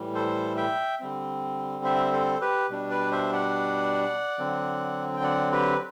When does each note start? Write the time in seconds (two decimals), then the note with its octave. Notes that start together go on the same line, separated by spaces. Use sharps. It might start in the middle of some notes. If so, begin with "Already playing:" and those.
Already playing: A2 E3 G3
0.15 A4 C5
0.57 E5 G5
1.00 D3 G3 C4
1.84 C5 E5
2.13 A4 C5
2.41 G4 B4
2.69 B2 G3 D4
2.91 B4 D5
3.12 C5 E5
3.33 D5 F#5
4.39 D3 F#3 C4
5.16 G5
5.24 D5 F#5
5.52 G4 B4